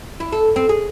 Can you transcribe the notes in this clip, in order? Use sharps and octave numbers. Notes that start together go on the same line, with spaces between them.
E4
A4
C4
G#4